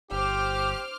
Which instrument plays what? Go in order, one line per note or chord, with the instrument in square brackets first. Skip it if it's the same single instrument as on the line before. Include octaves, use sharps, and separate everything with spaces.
[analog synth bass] G1 [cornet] G4 [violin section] C5 D6 F6